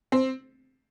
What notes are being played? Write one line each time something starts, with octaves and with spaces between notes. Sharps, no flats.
C4